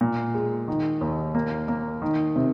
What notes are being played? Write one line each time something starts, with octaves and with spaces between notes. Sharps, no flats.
A#2
G#3
D#3
D#2
A#3
A#3
D#3
C3